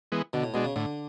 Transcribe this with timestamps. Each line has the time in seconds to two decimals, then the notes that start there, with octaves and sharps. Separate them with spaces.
0.12 E3 G#3 B3
0.33 B2 D3
0.44 A2
0.54 B2 G#3 D4
0.65 C#3
0.76 A2 D3